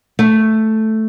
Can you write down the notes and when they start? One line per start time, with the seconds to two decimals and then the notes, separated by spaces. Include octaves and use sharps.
0.19 A3